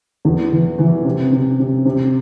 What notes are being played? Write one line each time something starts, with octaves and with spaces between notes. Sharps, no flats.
E2
E3
E3
C3
C3
C3
C3